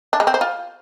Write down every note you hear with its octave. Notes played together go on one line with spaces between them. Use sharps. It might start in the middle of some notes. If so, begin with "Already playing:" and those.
D4
G#3
C4
C5
F4